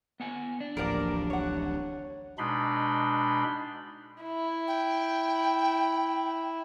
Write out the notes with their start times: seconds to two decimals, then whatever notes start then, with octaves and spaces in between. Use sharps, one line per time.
0.20 B3 F#5 G#5
0.60 D4
0.77 D1 A1 F3 G3 A#3 A#4 D5
1.30 C#5 F#5
2.38 B2 G#3 D4 D#4 B5 C6
4.22 E4
4.68 G5